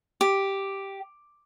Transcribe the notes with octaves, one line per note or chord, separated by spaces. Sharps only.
G4